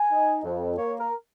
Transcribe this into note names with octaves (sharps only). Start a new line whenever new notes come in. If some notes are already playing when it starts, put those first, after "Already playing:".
Already playing: G#5
D#4
F2
A#3 C#5
A#4